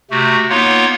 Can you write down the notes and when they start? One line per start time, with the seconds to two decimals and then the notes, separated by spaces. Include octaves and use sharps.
0.11 C3 A3 F#4
0.50 A#3 B3 D#4 F4 C#5 F#5